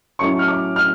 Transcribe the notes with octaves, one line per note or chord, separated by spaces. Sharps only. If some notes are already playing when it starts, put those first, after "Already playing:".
A2 F#3 A3 C#4 C#6
F6
D6
F6